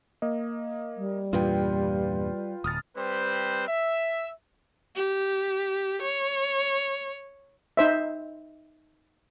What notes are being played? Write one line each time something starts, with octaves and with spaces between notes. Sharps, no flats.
A#3 D#5
G3
E2 G2 A#2 F4 B4 G5
D1 D#6 F6 A6
G3 C4 B4 C5
E5
G4
C#5
D#4 C5 E5